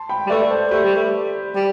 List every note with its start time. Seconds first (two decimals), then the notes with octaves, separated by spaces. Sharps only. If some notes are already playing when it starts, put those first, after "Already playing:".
Already playing: A5 C6
0.09 G5 B5
0.26 G3
0.30 A3 B4 D5
0.50 A4 C5
0.71 A3 G4 B4
0.84 G3
0.96 A3
1.55 G3